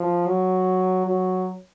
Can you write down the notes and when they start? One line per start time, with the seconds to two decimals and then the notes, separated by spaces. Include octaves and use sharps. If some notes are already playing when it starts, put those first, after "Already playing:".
Already playing: F3
0.26 F#3
1.06 F#3